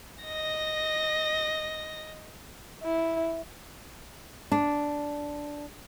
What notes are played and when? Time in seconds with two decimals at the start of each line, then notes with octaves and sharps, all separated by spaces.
0.24 D#5 A#6
2.83 E4
4.52 D4